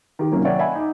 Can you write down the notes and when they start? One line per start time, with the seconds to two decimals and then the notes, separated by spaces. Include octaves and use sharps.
0.19 D#3 G4
0.32 F#2 C3 D#3 F#3 A#3 C#4
0.45 C#5 D5 E5 F#5 G5
0.59 D#5 E5 F#5 G#5 B5
0.75 D#4 D6